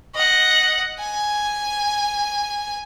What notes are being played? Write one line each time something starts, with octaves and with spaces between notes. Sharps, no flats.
D#5 F#5
G#5